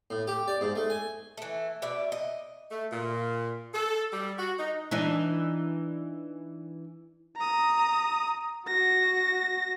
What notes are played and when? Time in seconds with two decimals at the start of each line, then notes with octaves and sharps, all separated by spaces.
0.10 A2
0.27 G4
0.48 D5
0.61 G#2
0.76 A3
0.90 G#5
1.37 E3 A3
1.82 B2 D5 E5
2.12 D#5
2.71 A3
2.92 A#2
3.74 A4
4.13 G3
4.39 F#4
4.59 D#4
4.91 E3 D4 D#4
7.36 A#5 D#6
8.66 F#4 A#6